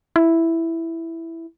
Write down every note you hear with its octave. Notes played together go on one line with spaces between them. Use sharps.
E4